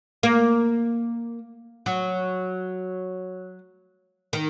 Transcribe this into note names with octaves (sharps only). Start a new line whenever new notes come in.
A#3
F#3
D#3